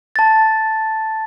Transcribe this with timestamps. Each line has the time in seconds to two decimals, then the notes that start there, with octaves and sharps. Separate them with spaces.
0.16 A5 A6